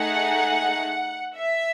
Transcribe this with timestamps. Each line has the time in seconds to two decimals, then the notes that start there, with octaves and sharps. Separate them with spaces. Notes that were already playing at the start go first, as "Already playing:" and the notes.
Already playing: A3 D#4 G#4 F#5
1.36 E5